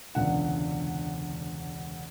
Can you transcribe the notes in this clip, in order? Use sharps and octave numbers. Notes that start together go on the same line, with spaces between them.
E1 C#2 D3 F#5